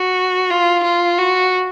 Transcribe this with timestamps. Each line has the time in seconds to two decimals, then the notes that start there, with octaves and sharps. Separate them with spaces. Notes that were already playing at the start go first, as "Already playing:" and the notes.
Already playing: F#4
0.50 F4
0.83 F4
1.19 F#4